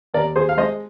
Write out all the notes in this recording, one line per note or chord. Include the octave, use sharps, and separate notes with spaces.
D#2 A#4 D5
D#2 G#4 C5
F5
G#3 C5 D#5